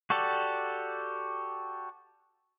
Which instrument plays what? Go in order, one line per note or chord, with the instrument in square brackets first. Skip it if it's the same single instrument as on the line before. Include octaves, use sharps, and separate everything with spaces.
[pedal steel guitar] F#4 G4 A4 D5